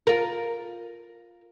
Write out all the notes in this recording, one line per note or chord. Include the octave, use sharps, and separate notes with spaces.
F4 A#4